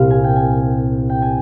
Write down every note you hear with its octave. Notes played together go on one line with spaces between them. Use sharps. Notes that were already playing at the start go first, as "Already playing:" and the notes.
Already playing: C2 A#2 G3 F5
G#5
G5
G#5
G5
G#5